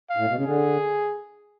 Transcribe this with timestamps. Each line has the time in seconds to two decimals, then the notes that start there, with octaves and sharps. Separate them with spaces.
0.10 F5
0.17 A2
0.27 B2
0.36 C#3
0.45 D3 G#4